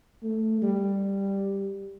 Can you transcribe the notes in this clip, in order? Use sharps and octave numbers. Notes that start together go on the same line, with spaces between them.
A3
G3